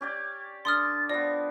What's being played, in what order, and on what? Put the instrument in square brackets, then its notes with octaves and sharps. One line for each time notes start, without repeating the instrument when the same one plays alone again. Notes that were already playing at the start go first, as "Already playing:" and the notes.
[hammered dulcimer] C#4 G4 D5 [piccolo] G#6
[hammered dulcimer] D3 [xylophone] C6 D#6 F6 [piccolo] A6
[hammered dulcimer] F3 B3 [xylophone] D5 [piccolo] A#6